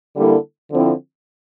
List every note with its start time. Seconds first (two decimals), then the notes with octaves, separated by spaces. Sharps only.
0.15 D3 G3 A#3 E4 A4
0.72 D3 F3 C4 E4